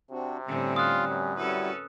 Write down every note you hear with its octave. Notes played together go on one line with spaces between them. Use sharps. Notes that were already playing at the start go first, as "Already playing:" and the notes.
C3 C4 D4 F#4
A2 D3 G3 C4 C#4
F4 D#6 F#6
F#2
G3 C#4 E4 F#4 A4 B4